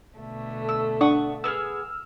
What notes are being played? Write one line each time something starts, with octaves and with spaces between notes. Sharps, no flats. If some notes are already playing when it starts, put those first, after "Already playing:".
B2 D3 A3
E6
D4 F#5 C#6 D#6
B3 G#4 E6 F6